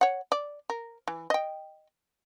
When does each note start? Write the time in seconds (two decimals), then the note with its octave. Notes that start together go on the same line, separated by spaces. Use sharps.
0.01 C#5 F#5
0.32 D5
0.70 A#4
1.08 E3
1.30 D#5 G5